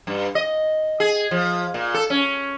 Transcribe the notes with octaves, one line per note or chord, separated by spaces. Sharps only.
G2
D#5
G#4
F3
A#2
A4
C#4